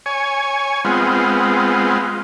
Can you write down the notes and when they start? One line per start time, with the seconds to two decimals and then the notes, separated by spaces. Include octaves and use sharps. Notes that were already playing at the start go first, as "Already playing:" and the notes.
0.06 C#5 G#5
0.85 G#3 B3 C4 F4